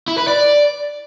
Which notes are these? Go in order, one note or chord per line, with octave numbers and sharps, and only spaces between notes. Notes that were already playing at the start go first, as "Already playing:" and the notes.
E4
B4
D5